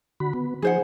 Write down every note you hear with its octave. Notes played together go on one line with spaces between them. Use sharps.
D3 F#4 B5
B3
F3 D#4 G#4 C5 F#5